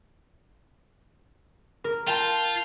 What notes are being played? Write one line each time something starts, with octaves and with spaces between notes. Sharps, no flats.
A#4
F4 G5 A5